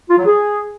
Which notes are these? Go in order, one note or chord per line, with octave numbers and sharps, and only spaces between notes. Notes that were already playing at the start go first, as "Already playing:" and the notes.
F4
F#3
G#4